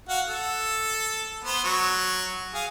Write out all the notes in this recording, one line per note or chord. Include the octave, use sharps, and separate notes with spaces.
F#4 F5 F#5
A4
B3 C5
F#3 C#6
G#4 F5